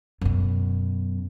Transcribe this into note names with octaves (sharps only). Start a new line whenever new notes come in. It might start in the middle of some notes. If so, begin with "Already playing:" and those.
F#2 B2